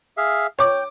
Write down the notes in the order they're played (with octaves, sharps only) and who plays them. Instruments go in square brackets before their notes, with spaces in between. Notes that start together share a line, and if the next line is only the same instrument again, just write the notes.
[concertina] G#4 E5 F5
[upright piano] C#5 D6 [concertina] G5